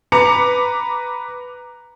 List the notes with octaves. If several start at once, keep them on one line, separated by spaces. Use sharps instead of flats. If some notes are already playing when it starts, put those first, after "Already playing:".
B4 A#5 D6 C#7